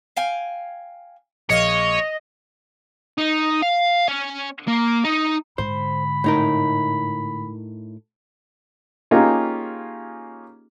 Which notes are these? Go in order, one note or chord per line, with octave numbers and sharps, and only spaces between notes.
F5 G5 G#5
A#1 G#3 A#3 C#5 D#5
D#4
F5
C#4
A#3
D#4
G#2 D3 C5 B5
A2 D#4 A#4
A#3 C#4 D#4 F4 G4 G#4